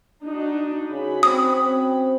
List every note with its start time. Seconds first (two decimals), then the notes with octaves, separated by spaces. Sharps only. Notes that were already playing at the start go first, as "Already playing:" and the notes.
0.24 D4 D#4 F#4
0.90 C#3 C#4 F#4 B5
1.23 C4 D#6
1.60 C4